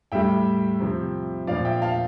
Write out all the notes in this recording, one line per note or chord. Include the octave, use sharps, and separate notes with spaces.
A2 G3 E5 G5
C3 F3
A#2 F3 D5 F5
E5 G5
F5 A5